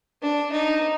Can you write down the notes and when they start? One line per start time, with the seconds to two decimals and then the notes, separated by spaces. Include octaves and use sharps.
0.23 D4
0.52 D#4